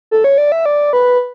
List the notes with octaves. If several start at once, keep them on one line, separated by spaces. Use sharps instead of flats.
A4
C#5
D5
E5
D5
B4